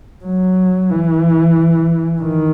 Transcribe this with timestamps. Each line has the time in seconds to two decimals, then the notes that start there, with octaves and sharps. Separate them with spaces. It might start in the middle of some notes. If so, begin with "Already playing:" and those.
0.25 F#3
0.91 E3
2.23 D#3